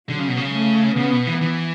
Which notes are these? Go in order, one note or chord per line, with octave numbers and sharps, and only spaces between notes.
D3 F#3
C#3
B2
C#3
A3
C#3 B3
B2
E3
E3